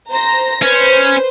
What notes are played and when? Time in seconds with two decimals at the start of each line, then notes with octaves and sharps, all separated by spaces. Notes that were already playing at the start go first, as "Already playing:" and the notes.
0.11 C5 A#5 A#6
0.62 C#4 B4 C5